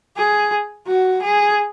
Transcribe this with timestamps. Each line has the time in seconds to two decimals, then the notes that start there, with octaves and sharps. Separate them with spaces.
0.16 G#4
0.87 F#4
1.22 G#4